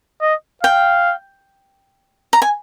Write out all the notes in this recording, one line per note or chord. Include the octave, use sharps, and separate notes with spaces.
D#5
F5 G5
A#5
G#5